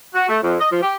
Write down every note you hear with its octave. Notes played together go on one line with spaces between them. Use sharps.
F#4
A3
F2
D#5
F3
G4